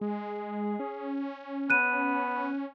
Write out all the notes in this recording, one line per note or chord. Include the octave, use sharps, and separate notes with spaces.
G#3 G#4
C#4
B3 F#6 D#7